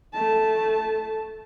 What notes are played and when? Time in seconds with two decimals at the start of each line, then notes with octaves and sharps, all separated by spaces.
0.13 A3 A5